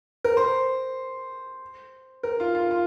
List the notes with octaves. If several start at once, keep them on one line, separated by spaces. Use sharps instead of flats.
A#4
C5
A#4
F4
F4
F4